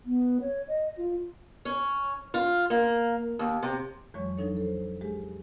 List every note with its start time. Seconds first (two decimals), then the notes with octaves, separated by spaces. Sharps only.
0.05 B3
0.41 C#5
0.68 D#5
0.97 F4
1.65 C#4
2.34 F4
2.70 A#3
3.39 D#2
3.63 C3
4.14 F2 E3 F#3 G#3 C#5 C#6
4.37 F3 F#3 D4 D#4 A4 C#5
4.57 A4 C5
5.01 G#3 G4 G#4